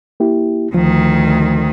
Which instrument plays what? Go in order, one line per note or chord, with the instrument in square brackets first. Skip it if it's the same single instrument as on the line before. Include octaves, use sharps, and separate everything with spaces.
[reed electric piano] A#3 E4 G4
[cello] D2 D#3 [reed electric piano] F3